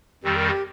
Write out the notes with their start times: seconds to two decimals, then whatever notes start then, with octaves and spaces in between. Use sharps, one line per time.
0.23 F2 D#3 G3 C4 G4
0.36 A#4
0.49 G4